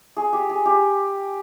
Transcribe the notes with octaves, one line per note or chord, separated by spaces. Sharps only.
G#4
G4
G#4
G4